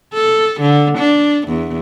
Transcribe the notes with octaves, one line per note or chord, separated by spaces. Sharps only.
A4
D3
D4
E2